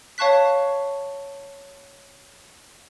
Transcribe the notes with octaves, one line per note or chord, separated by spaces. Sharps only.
C#5 F5 A5 C#6 F#6 B6